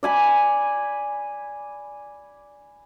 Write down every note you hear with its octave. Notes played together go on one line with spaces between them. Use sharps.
D5 G#5 B5